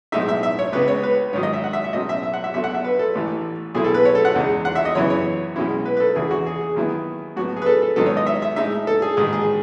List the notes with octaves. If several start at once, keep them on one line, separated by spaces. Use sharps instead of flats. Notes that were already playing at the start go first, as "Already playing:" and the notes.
B1 A2 G#3 D#4 E5
E5
E5
C#5
C#2 C#3 G#3 B3 B4
C#5
B4
G#2 D#3 F#3 C#5
D#5
E5
F#5
E5
E5
B1 A2 F#3 C#4 D#5
E5
E5
F#5
E5
B1 B2 A3 E5
F#5
E5
B4
A4
A1 A2 E3
B1 B2 A3 E4 G#4
A4
B4
C#5
A4
F#5
E2 C#3 G#3 D#4
F#5
E5
D#5
F#2 C#3 E3 B3 E4 C#5
C#5
B1 B2 G#3 C#4 E4
B4
B4
A4
E2 C#3 E3 A3 E4 G#4
F#4
G#4
G#4
D#2 D#3 F#3 B3 E4
A2 F#3 B3 F#4
G#4
B4
A4
A4
G#2 D#3 F#3 B3 D#4 A4
C#5
D#5
E5
E5
A2 G#3 D#4 E5
A4
G#4
A1 G#2 D#3 G#3 G#4
G#4